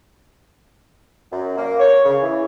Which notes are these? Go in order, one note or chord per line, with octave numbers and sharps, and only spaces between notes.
F#2
A#3
C#5
C#3
E3